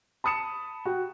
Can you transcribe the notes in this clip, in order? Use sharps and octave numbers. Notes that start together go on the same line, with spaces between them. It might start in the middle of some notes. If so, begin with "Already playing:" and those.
A5 B5 D#6 C#7 E7
F#4 G5